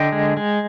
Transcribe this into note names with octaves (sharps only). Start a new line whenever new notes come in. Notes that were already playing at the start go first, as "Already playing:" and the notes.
Already playing: D3 D#5 G5
G#3
G#3